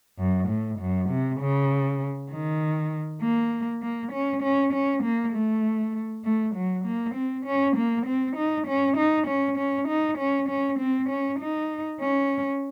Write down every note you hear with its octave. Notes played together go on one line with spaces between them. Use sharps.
F#2
A2
F#2
C3
C#3
D#3
A#3
A#3
C#4
C#4
C#4
A#3
A3
A3
F#3
A#3
C4
C#4
A#3
C4
D#4
C#4
D#4
C#4
C#4
D#4
C#4
C#4
C4
C#4
D#4
C#4